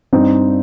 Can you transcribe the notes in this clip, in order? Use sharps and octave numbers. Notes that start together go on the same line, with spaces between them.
G2 C4 D#4